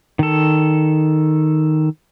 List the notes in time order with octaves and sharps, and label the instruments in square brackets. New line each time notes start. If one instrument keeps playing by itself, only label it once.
[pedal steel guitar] D#3 A4